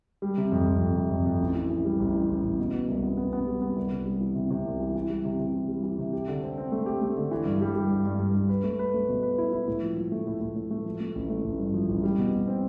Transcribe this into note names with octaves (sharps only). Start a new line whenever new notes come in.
G3
C3
F2
F2
F2
C3
F2
F2
A1
E3
E3
G3
A1
E3
A1
A1
B2
B2
C2
B3
B3
B3
G3
B3
C2
C3
G3
E3
C3
C3
C2
E3
E3
G3
C3
C3
E3
G3
E3
C3
G4
D3
C4
C4
A3
G4
A3
D3
E3
G2
G3
G3
G2
G2
G2
G2
B4
A3
B4
A3
B2
B4
E4
E4
A2
F3
F3
A3
A2
A2
A2
A3
F3
A3
A1
A3
A1
G2
F3
A1
G3
B2
B2
C4